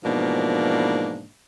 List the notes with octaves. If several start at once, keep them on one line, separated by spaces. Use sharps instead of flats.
G#2 B2 E3 F3 A#3 D4